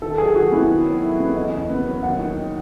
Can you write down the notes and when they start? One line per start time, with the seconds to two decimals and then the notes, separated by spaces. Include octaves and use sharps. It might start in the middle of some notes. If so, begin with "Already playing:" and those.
0.02 D#3 A4
0.18 F#3 G#4
0.35 D#3 F#4
0.52 B3 E4
0.69 D#3
0.86 F#3
1.03 E4
1.20 B3
1.36 E2 D#5
1.53 C#3
1.69 B3
1.86 F#3
2.03 D#2 F#5
2.19 D#3
2.36 D#4